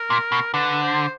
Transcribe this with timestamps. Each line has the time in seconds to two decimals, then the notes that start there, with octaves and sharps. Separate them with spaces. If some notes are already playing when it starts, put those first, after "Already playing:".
Already playing: A#4
0.10 A#2
0.32 B2
0.54 D3 B4
0.82 C5